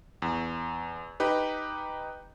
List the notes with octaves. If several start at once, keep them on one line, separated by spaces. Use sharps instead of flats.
E2
D#4 G4 B4